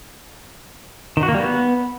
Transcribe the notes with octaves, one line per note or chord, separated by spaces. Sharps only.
D#3
F#4
A#3
G3
B3